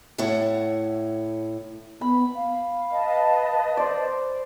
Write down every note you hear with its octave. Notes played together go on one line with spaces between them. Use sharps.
A2 E4 A4 C#5 F#5
B3 B5
F5
B4 D#5 A5
C5 D5